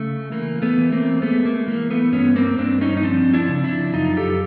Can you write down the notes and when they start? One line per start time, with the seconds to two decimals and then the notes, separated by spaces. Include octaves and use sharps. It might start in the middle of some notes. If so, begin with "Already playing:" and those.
Already playing: C#3 A3
0.32 E3 A#3
0.62 A3 B3
0.78 E3
0.92 A#3 C4
1.22 G#3 A3 B3
1.45 A#3
1.67 E3 A#3
1.90 A3 B3
2.12 G2 B3 C#4
2.36 A#3 C4
2.58 G2 C4 D4
2.81 C#4 D#4
2.97 D#4
3.03 F3 C4 D4
3.33 D4 E4
3.49 C#3
3.64 D4 E4
3.94 F#2 D#4 F4
4.17 G4 A4